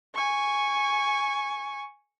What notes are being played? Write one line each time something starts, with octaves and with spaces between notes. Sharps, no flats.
G#5 C#6